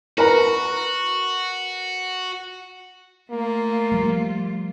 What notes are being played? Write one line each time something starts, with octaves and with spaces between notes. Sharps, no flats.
F#4 A#4 B4 A#5
A3 A#3 F4
F3 G3